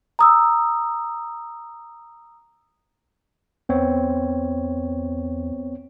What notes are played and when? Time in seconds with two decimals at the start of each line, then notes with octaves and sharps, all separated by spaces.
0.19 A#5 D#6 E6
3.69 E2 B3 C4 C#5